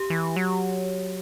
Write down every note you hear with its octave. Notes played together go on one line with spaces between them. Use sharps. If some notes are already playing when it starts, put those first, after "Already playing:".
Already playing: G4
E3
F#3